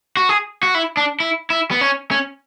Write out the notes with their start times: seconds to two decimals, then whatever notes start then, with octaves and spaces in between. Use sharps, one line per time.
0.17 F#4
0.29 G#4
0.63 F#4
0.75 E4
0.97 D4
1.20 E4
1.50 E4
1.71 B3
1.81 C#4
2.11 C#4